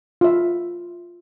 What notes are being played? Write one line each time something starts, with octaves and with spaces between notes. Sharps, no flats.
F4 E5